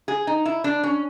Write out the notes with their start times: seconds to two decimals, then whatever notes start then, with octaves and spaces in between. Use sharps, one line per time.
0.08 G#4
0.27 D#4
0.45 E4
0.64 D4
0.84 C#4